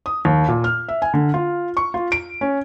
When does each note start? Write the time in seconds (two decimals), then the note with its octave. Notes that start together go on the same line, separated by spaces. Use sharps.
0.06 D#6
0.25 D#2
0.48 A#2
0.64 F6
0.88 E5
1.02 G#5
1.14 D3
1.34 F4
1.77 C#6
1.94 F4
2.12 D7
2.41 C#4